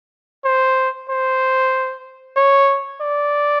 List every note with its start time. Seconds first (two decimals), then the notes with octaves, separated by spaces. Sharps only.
0.45 C5
1.10 C5
2.37 C#5
3.01 D5